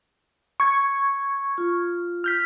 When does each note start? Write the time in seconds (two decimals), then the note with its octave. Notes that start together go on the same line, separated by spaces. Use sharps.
0.60 C#6 G#6
1.58 F4
2.24 F6 G6 B6